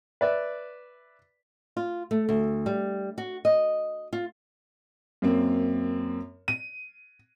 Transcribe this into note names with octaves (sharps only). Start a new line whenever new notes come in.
B4 D5 E5
F4
A3
D2
G3
F#4
D#5
F4
F#2 A#3 C4
D#7